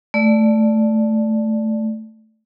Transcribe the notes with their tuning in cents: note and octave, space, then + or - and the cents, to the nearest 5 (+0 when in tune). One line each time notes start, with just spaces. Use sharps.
A3 -5 D5 +0